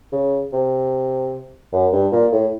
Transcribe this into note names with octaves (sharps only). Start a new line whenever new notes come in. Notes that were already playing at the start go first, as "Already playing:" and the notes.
C#3
C3
F#2
G2
A#2
A2